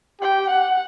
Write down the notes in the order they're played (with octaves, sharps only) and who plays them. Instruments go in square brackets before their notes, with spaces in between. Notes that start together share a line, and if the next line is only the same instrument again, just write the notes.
[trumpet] G4 [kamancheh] G5
[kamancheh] F#5